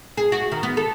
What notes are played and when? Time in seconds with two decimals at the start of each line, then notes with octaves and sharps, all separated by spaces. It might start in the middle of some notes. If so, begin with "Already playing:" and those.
0.17 G#4
0.32 F#4
0.52 D#3
0.63 B3
0.77 A4